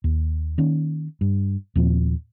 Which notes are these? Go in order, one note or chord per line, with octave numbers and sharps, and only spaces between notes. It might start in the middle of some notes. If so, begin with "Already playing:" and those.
D#2
D#3 A#3 C#4
G2
D#2 A#2 F3 C4